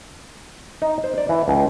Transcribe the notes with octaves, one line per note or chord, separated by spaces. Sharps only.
D#4
C5
D5
E3
C#2